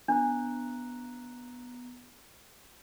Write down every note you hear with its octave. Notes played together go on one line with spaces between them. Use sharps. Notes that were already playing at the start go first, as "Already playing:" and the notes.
B3 D4 A#5 F#6